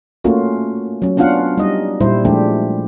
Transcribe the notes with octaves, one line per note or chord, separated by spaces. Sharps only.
A3 A#3 C#4 F4 F#4
F#3 C#4
B3 C#4 D4 F4 F5 F#5
G3 D#4 D#5
A#2 G3 E4 C5
F3 G#3 A3 D4 G4